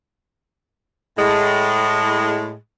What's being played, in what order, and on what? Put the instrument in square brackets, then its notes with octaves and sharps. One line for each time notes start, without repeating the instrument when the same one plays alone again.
[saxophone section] A2 G#3